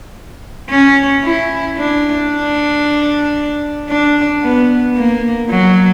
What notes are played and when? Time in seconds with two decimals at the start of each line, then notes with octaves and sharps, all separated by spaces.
0.70 C#4
1.24 E4
1.77 D4
2.30 D4
3.90 D4
4.43 B3
4.96 A#3
5.49 F#3